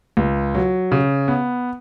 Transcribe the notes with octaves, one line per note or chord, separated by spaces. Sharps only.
C#2
F#3
C#3
B3